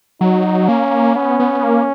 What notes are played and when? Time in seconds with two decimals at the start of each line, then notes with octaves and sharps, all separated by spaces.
0.21 F#3 D#4
0.68 A#3 C#4
1.15 B3 C#4
1.39 B3
1.64 A#3